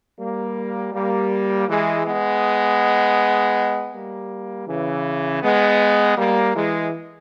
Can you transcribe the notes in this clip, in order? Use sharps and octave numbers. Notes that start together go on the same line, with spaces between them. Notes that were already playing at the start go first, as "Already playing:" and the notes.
G3 A#3
G3 A#3
E3 G#3
G#3 B3
G3 A#3
C#3 E3
G#3 B3
G3 A#3
E3 G#3